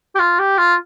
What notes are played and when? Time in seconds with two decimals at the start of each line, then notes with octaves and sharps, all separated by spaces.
0.15 G4
0.19 F4
0.39 G4
0.58 F4